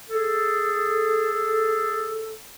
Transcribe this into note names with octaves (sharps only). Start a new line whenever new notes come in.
G#4 A4